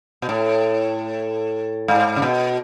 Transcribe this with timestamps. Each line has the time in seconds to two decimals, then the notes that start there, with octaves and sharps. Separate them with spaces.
0.22 B2
0.29 A2
1.88 G#2
2.16 C#3
2.22 B2